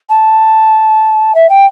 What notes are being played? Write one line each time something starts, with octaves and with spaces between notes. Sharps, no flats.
A5
E5
G5